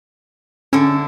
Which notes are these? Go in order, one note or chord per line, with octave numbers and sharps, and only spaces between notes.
D3 C#4 E4